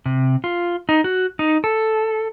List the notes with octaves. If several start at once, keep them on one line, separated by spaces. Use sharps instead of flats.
C3
F4
D#4
F#4
D#4
A4